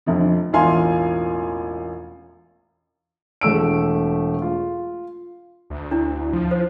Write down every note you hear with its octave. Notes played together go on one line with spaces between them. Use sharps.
F1 F2 D3
E1 A1 F4 F5 G#5 C6
E1 A3 E6 D7
F4
D2
D4 E4
F3
C5